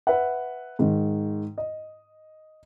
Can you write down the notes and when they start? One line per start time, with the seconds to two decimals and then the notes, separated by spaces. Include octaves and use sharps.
0.07 B4 E5 F#5
0.79 G#2 D#3
1.58 D#5